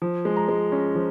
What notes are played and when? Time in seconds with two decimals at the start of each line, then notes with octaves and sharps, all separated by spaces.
0.02 F3
0.25 G#3
0.37 A#5
0.49 G#3
0.72 C#4
0.95 F3